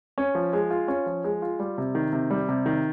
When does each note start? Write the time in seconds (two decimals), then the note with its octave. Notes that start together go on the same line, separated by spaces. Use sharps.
0.18 C#4
0.35 F3
0.53 G#3
0.70 F4
0.88 C#4
1.06 F3
1.24 G#3
1.42 F4
1.60 G3
1.78 C3
1.95 D#3
2.13 C3
2.30 G3
2.49 C3
2.66 D#3